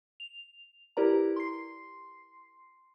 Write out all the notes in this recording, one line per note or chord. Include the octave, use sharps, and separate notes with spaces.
F7
E4 G4 A#4 B4 D5 A#5
C6 C7